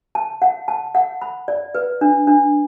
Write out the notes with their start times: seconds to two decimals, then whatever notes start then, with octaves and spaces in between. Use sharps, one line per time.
0.15 A5
0.42 F#5
0.68 A5
0.95 F#5
1.22 B5
1.48 D5
1.75 B4
2.01 D4
2.27 D4